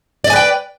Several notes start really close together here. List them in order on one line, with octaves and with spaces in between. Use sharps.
D5 D#5 G#5 B4 G5